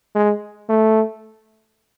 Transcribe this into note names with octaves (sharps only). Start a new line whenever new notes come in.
G#3
A3